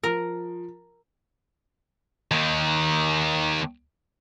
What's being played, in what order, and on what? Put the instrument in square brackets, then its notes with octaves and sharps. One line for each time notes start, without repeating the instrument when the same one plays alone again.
[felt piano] F3 [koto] A#4
[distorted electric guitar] D#2 D#3